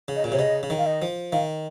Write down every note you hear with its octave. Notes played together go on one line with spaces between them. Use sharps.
C#3
D#5
A#2
C3 C#5
C#3 D#5
C#3
D#3
F5
D#5
F3
D#3 F5